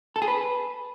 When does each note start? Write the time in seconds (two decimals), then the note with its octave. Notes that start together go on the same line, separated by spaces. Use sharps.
0.16 A4
0.22 G#4
0.28 B4